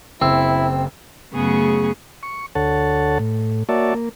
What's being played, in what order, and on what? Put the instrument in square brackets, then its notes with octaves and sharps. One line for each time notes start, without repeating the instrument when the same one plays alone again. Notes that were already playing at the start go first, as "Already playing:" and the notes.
[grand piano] F#1 E6 [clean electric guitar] C4 [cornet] E4
[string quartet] F#2 C#3 A3 B3 G#4 C#6
[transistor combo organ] C#6
D2 A4 C#5 F#5 A5
A2
A#3 F#4 C#5 D5 E5 A5
A#3